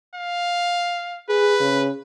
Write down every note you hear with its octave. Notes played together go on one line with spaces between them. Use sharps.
F5
G#4 B4
C#3